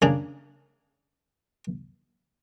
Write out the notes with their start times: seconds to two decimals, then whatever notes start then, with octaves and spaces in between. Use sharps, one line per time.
0.02 C#3 A#3 D4 G#4